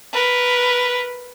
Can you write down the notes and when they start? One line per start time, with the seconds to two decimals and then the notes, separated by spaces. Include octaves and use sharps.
0.13 A#4 B4